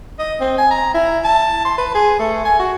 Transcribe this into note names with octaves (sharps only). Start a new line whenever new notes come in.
D#5
C4
G#5
A#5
E4
A5
C6
B4
G#4
A3
G#5
F#4